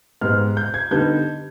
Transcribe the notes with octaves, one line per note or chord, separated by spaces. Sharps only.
G#2 G3 B3 F6
G6
G#6
D3 G3 B3 D#4 G6